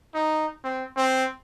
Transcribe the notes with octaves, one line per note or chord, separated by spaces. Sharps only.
D#4
C4
C4